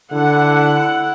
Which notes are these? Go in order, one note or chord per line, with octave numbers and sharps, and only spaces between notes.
D3 E4 F#5